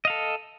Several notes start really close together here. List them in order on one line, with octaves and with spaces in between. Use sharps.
D#5 F5 A4